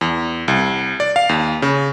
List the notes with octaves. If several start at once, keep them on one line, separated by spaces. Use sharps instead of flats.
E2
C2
D5
F5
D#2
C#3